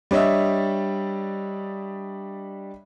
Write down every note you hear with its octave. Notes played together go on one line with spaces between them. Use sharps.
G3 D4 C#5 D#5 E5